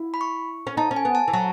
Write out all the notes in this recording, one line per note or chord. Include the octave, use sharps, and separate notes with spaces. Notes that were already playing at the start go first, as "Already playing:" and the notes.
Already playing: E4
B5
C#6
C#4
D#4 A5
C#4
G#5
B3
A5
E3
F#3 A5